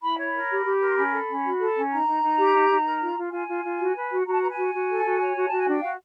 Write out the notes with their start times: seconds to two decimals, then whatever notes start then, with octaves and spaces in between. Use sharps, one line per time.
0.01 E4 B5
0.17 C#5
0.24 B5
0.33 A#4
0.49 G4
0.64 G4
0.79 A#4
0.89 C6
0.95 C#4 B5
1.11 A4
1.27 C#4
1.43 F#4
1.58 A4
1.75 C#4
1.90 D#4 A#5
2.05 D#4
2.21 D#4
2.36 G4
2.53 D#4
2.68 D#4
2.84 A#4
3.00 F4
3.16 F4
3.31 F4 G#5
3.47 F4
3.63 F4
3.78 F#4
3.94 B4
4.10 F#4
4.25 F#4 A#5
4.33 A5
4.41 B4 A#5
4.49 G#5
4.57 F#4
4.73 F#4
4.88 A4
5.04 F#4
5.20 C#5
5.36 F#4
5.47 F#4 A5
5.57 G#5
5.67 D4 G5
5.79 F#4 F5